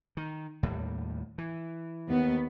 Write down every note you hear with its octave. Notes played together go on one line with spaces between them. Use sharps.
D#3
D#2 A2 G3
E3
D#2 B3